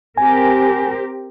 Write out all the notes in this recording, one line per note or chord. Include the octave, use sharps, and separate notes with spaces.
C4 G4 A#4 G#5